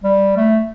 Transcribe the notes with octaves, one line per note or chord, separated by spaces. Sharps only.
G3
A3